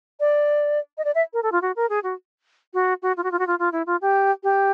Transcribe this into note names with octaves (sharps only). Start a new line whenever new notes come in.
D5
D#5
D5
E5
A#4
A4
F4
F#4
A#4
G#4
F#4
F#4
F#4
F4
F#4
F4
F#4
F4
F4
E4
F4
G4
G4